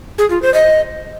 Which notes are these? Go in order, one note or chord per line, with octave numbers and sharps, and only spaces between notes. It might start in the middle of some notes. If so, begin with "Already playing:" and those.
G#4
F4
C5
D#5